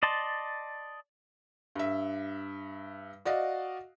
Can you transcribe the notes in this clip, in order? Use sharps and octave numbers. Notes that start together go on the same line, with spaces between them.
D5 D#5 A5 C6
G2 E5
F#4 D5 D#5 F5